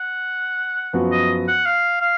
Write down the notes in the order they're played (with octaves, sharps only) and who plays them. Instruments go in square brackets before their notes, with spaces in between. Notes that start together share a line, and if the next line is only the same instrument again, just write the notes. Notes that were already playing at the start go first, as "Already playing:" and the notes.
Already playing: [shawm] F#5
[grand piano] F#2 F3 B3 F#4
[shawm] D#5
F#5
F5
F5